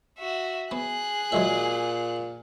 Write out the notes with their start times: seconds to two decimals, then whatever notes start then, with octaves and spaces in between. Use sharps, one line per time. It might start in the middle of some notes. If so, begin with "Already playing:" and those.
0.18 F#4 E5
0.71 B3 G#4 F#6
1.32 A#2 F#3 G#3 E5